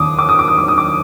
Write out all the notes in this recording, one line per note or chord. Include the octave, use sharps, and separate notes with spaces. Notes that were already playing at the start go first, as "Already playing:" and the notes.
Already playing: D#2 D4 D6 D#6
D#3 D6
D#6
D6
D#6
D#2 D6
D#6
D6